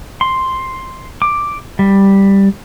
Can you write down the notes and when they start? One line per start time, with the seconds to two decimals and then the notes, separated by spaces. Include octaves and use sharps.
0.21 C6
1.22 D6
1.79 G3